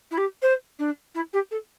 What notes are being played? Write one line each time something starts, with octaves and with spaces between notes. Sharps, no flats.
E4
G4
C5
D4
E4
G4
A4